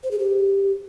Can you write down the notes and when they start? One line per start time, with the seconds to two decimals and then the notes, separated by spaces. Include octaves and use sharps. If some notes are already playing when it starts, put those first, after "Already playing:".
0.03 C5
0.11 G#4
0.19 G4